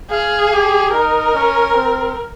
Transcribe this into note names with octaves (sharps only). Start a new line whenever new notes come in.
G#4 F5
G4
D#4 A#4
C#4
C4